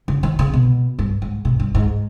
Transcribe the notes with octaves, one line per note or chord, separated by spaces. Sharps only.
C#3
D#3
C#3
B2
G2
G#2
B2
G2
G#2